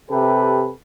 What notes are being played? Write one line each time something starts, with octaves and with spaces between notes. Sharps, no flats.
C3 G4 A4 B4